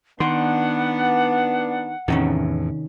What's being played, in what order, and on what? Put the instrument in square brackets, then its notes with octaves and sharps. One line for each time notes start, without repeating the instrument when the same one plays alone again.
[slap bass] D#3 [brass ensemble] B3 D4 [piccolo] F#5 [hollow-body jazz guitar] C6
[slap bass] E2 A2 [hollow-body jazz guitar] C3 D#3 C#4